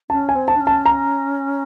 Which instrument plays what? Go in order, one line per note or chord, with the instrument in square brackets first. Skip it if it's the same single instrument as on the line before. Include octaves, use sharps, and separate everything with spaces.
[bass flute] C#4 [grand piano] A5
[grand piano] G#5
[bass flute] C4
[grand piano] A5
[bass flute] D4
C#4
[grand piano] A5
A#5